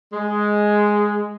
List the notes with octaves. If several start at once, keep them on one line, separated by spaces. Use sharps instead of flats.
G#3